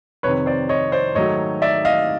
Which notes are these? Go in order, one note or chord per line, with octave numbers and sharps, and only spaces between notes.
F2 C3 D#3 B4 C#5
C5 D5
C#5 D#5
C5 D5
G#2 D#3 F#3 A3 C#5 D#5
D5 E5
D#5 F5